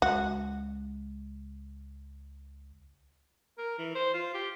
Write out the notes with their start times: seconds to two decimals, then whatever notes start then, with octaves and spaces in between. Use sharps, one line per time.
0.02 C#2 G#3 F#4
3.58 A#4
3.79 E3
3.95 C5
4.14 F4
4.34 G4